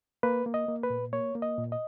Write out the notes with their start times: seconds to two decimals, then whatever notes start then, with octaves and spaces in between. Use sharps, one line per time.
0.23 A#3 B4
0.46 A#3
0.54 D#5
0.68 A#3
0.83 B4
0.90 A#2
1.13 A#3 C#5
1.35 A#3
1.42 D#5
1.58 A#2
1.72 D#5